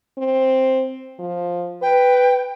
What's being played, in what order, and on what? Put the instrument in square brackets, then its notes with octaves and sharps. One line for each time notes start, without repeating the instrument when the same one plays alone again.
[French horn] C4
F3
[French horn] B4 [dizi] G5